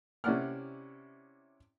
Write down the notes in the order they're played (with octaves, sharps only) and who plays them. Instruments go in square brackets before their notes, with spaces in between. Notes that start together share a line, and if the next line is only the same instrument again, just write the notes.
[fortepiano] C3 C#4 E4 D5 F#5 F6